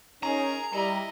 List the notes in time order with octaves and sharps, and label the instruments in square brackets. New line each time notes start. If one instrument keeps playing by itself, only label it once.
[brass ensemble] C#4 D#4 [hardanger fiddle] G#4 A#4 [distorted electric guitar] A#5
[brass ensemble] G3 [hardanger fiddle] E4 D#5